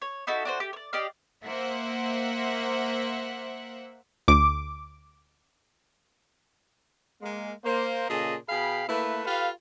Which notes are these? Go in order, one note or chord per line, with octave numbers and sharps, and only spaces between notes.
C#5
D#4 E4 F#4 A4
D4 F#4 C5
G4
C#5 D5
G4 D5 D#5 F5
A#3 C5 E5 F#5
D2 D6
G#3 A#3
A#3 C5
A#2 C#3 G#4 A4 D#5 A5
B2 G#4 F5 G5 B5
A3 A#3 E4 B4
F4 G4 A4 B4 F5